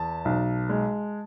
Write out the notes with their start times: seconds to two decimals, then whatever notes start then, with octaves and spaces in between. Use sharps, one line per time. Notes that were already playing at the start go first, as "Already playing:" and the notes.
Already playing: E2 A5
0.25 B1
0.69 G#3